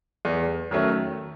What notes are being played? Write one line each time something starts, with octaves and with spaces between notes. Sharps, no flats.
E2
D#3 F#3 A3 C#4